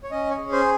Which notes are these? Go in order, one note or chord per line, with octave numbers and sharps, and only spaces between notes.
C#5
C#4 D#5
C#5
G#4
C5